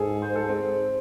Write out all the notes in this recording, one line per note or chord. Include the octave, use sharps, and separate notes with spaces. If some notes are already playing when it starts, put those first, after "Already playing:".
Already playing: G#2 G#4 A4
C5
A4
C4